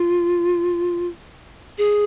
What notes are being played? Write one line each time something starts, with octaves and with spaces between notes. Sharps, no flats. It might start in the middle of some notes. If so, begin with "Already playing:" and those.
Already playing: F4
G#4